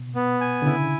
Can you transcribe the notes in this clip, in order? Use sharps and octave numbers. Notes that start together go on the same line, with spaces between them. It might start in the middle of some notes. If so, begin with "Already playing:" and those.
Already playing: B2
B3
G#5
D3
C#3 E4